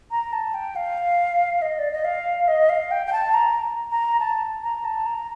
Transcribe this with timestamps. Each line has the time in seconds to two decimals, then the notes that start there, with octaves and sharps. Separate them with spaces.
0.11 A#5
0.32 A5
0.54 G5
0.75 F5
1.61 D#5
1.78 D5
1.91 D#5
2.04 F5
2.47 D#5
2.69 F5
2.91 G5
3.06 G5
3.12 A5
3.33 A#5
3.91 A#5
4.19 A5
4.63 A#5
4.84 A5
5.05 A#5